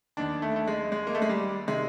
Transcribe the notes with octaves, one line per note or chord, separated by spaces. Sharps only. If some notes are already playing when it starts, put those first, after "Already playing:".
D#2 D#3 D4
A3
A3
G#3
G#3
A#3
A3
G#3
G3
C3 D#3 G#3